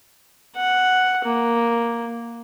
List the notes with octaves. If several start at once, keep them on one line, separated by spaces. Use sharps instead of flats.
F#5
A#3